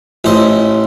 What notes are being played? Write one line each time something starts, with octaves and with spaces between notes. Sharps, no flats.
A1 A2 C5 D#5